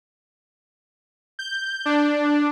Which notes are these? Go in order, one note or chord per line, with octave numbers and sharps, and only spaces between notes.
G6
D4